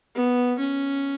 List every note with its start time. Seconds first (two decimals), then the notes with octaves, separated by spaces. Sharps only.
0.15 B3
0.59 C#4